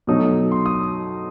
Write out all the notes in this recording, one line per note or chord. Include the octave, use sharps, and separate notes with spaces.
B2 F#3 A3 D#4 D#6
C6
D#6